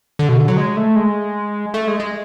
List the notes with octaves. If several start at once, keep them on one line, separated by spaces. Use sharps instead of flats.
D3
B2
D3
F#3
G#3
A3
G#3
A3
G#3
G#3